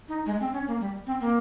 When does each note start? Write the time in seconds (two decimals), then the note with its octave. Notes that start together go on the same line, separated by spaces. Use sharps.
0.08 D#4
0.26 G#3
0.40 C4
0.53 C#4
0.67 A#3
0.80 G3
1.07 C4
1.21 A#3